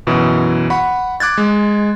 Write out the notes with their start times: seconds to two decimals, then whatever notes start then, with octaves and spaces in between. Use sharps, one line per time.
0.07 F#2 B2 E3 E4
0.70 F#5 B5 C#6
1.20 D6 F#6 G#6 A6
1.38 G#3